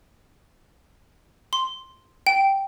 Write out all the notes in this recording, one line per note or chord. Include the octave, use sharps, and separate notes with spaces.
C6
G5